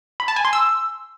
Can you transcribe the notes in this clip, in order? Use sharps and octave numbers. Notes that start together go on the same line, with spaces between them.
B5
A5
G#5
C6
E6